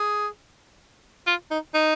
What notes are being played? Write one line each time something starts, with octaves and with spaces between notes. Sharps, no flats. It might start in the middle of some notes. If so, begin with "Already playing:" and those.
Already playing: G#4
F4
D#4
D#4